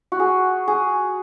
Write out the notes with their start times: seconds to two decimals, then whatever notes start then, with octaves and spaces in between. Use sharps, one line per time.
0.12 F#4
0.20 G#4
0.68 G#4